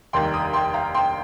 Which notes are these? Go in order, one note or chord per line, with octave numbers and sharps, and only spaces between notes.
F1 D#2 D#3 G3 G5 C6
A#5 D#6
G5 C6
F5 A#5
G5 C6